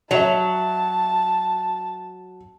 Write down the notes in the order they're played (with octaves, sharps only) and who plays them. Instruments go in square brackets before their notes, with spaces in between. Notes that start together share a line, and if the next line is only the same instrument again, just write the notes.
[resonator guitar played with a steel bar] F#3 [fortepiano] C#5 E5 [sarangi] A5